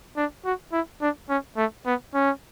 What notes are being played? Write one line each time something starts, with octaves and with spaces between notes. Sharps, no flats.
D4
F#4
E4
D4
C#4
A3
B3
C#4